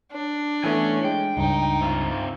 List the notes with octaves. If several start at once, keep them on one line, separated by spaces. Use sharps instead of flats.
D4
E3 A3 B3 C#5 G#5
G#3 G5
C#2 G2 D#4
C3 F4